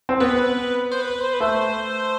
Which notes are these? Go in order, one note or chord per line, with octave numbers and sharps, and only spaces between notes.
C4
B3 B4
C5
B4
C5
B4
A3 C5